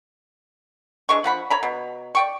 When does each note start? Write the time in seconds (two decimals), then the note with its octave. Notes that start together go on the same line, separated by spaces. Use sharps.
1.09 E3 G#3 D4 C#6
1.24 F3 F#5 B5
1.50 C#5 A#5 B5
1.63 B2
2.15 D5 G5 C#6